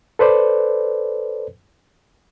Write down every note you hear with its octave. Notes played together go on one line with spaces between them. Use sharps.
A4 B4 C5 D5